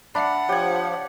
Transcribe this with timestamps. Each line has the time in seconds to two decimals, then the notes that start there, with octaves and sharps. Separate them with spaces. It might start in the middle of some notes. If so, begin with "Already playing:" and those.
0.15 D4 E5 F#5 B5
0.49 F3 G4 C#5 G#6